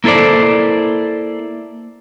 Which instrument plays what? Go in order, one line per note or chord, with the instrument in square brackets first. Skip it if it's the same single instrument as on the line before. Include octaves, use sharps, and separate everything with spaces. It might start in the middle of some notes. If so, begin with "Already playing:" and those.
[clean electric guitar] A#3 E4 A4 C5 D5